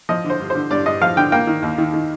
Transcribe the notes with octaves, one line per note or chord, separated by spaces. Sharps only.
F3 D#5
D3
C5
G2
D3 C5
G2 D5
G2 D#5
F3 F5
D3 G5
A#3 G5
D#3
D#2
D#3
D#3